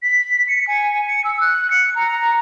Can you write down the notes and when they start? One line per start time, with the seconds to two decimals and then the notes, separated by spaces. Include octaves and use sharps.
0.03 B6
0.48 C#7
0.67 G#5
1.07 C#7
1.24 E6
1.41 F#6
1.71 C#7
1.95 A#5